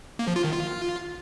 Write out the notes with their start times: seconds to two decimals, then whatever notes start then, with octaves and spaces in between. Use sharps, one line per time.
0.19 A#3
0.28 F3
0.36 F4
0.44 D#3
0.53 F4